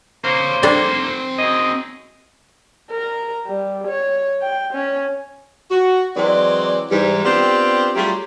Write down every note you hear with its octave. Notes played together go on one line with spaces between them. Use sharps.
A#3 C5 C#5 F5
G3 C4 D4 A4 G#5
F#2 G#4 D#5
A#4
G3
C#5
G5
C#4
F#4
E3 F#3 G#3 C4 D5
G#2 E3 G3
B3 C4 D4 F4 G4
F#3 G3 A3 F4 G4 G#4